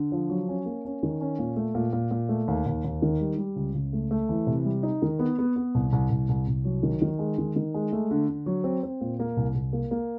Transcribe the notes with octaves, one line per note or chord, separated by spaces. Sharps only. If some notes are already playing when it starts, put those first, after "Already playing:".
Already playing: D3
F3
F#3
C#4
A#3
C#4
D#3
C#4
A#2
A3
A#2
A#2
A#2
A3
D#2
D#2
D#2
D#3
G3
G3
C#2
C#2
A3
A3
E3
C3
G3
D#4
D#3
B3
B3
B3
C2
C2
C2
C2
C2
F#3
D#3
D#3
G#3
D#3
D#3
G#3
A3
D3
D3
F#3
C4
C4
A#2
A#3
C2
C2
A#3
A#3